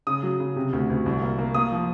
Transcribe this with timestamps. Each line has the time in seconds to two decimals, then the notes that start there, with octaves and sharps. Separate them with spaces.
0.07 C#3 D#6
0.23 F#3
0.40 C#3
0.56 C3
0.73 D2
0.90 D2
1.06 C2
1.22 A#3
1.39 A#3
1.55 A#3 D#6
1.72 F3